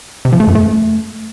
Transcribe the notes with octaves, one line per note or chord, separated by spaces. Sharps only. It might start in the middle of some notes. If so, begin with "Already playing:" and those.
C3
F3
A3
F#2
A3